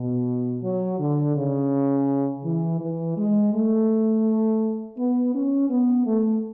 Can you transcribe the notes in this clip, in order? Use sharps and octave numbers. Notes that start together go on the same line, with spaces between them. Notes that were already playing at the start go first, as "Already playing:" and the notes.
Already playing: B2
F#3
D3
C#3
E3
E3
G#3
A3
B3
C#4
B3
A3